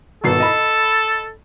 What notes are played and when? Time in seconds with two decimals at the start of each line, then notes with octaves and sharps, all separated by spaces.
0.24 G#1 B2 A4 C7
0.40 D#5 B5